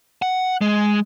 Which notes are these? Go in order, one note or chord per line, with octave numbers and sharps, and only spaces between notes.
F#5
G#3